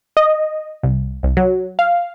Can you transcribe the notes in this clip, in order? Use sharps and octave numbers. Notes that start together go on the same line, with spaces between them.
D#5
C2
C2
F#3
F5